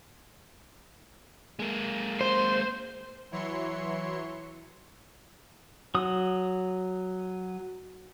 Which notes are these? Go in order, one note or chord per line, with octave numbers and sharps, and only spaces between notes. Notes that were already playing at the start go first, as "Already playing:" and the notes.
G#3 A#3
C5
E3 F#3 E4 C#5 C6 C#7
F#3 D#6